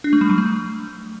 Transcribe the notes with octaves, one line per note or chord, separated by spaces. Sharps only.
D4
A3
G3
F#3
A3